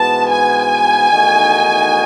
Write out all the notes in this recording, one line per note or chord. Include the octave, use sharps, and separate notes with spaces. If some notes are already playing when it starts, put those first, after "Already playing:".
Already playing: G#2 E3 B3 F#4 B4 A5
G#5
E2 D#3 A3 D#4 F#4